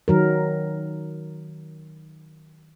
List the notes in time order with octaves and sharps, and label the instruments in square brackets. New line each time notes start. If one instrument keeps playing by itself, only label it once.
[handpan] D#3 F#3 A#4